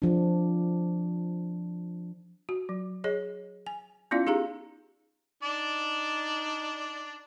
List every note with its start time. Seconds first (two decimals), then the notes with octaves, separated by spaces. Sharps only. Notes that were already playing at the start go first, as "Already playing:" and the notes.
0.02 F3 D4
2.49 F#4
2.69 F#3
3.04 G#4 C#5 D#5
3.67 G#5
4.11 B3 C#4 E4 F4 D5 F5
4.27 D#4 G4 G#4 F5 A#5
5.43 D4 D#4 D5